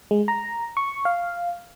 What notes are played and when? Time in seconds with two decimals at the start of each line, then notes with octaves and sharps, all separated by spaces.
0.11 G#3
0.28 A#5
0.77 C#6
1.05 F5